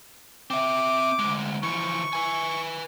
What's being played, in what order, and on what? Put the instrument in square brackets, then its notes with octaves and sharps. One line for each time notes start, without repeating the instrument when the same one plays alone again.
[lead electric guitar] C4 E5 [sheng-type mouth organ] D6
[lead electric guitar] D2 G#3
[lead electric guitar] E3 F3 [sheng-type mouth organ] C#6
[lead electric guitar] B4 G#5